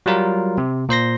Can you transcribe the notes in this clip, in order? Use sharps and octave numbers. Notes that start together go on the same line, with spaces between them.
F#3 G3 F4 A#4
C3
A#2 C5 C6 A#6